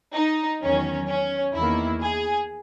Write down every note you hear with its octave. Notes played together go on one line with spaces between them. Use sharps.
D#4
E2 D#3 F#3 C#4
C#4
E2 D#3 A#3 E4
G#4